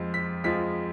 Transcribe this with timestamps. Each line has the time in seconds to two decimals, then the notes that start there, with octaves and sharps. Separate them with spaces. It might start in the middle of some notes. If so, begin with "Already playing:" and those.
Already playing: F2 F3 G#3
0.14 B6
0.44 F2 F3 G#3 B6